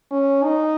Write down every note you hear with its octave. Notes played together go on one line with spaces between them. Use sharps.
C#4
D#4